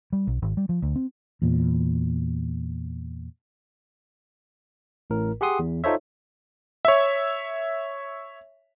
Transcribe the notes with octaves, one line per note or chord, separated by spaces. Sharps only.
G3
B1
G#1
G3
F3
D2
C4
E2 A#2
A1 A2 A#4
G4 G#4 F#5 C6 D#6
E2
D#4 F4 A4 C5 C#5 E5
C#5 E5